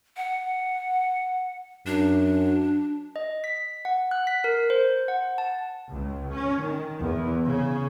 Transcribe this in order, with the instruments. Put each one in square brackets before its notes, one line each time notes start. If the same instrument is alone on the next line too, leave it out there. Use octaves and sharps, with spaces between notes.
[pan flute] F#5
[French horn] F#2 [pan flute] D4
[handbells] D#5
B6
F#5
F#6
B6
A#4
C5
F#5
A5
[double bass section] C#2
C#4
D#3
E2
C#3